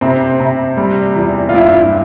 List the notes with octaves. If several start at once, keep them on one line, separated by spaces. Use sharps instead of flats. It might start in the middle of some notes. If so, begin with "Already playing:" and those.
C3 C4
C3
G3
E2
F4
G2 E4